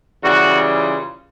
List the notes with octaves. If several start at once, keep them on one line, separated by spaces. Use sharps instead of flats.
C#3 E3 G3 F#4
F4